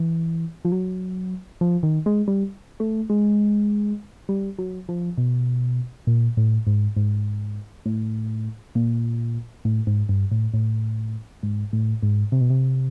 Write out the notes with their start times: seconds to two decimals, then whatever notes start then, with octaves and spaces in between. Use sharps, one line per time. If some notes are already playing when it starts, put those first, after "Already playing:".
Already playing: E3
0.65 F3
0.72 F#3
1.61 F3
1.83 D#3
2.06 G#3
2.28 G3
2.80 A3
3.10 G#3
4.29 G3
4.59 F#3
4.89 F3
5.18 B2
6.07 A#2
6.37 A2
6.67 G#2
6.96 G#2
7.86 A2
8.75 A#2
9.65 A2
9.87 G#2
10.09 G2
10.31 A2
10.54 A2
11.43 G#2
11.73 A2
12.03 G#2
12.32 C3
12.41 B2
12.50 C3